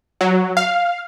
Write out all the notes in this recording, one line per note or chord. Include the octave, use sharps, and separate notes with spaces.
F#3
F5